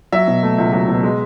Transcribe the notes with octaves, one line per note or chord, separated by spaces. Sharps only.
F#3 E5
B2
A3
C#2
F#3
B2
G#3